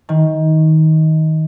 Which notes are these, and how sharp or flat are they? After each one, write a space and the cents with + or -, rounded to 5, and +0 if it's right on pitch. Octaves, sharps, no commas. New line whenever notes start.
D#3 +20